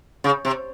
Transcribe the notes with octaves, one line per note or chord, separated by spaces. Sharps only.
C#3
C3